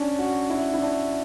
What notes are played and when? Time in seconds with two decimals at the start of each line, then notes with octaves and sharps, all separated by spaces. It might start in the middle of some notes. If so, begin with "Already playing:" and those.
Already playing: C#4 D4
0.19 F#4
0.50 E4
0.74 E4
0.81 D4